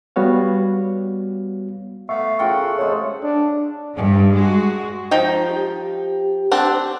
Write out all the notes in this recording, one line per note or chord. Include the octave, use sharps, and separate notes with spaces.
G3 B3 F#4 C#5 F5
A3 B3 E5 F5 C#6
C#3 E4 F4 A4 A#4 F#5 G5 C#6
C3 G#3 A3 C#5
D4
G2
G#3 F#4
F3 D#4 G5
G4
C4 D4 F#5